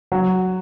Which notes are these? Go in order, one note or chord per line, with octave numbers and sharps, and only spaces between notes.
F#3